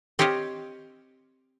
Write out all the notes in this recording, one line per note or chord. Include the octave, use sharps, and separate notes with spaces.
C4 G4 C#5 D#5 F5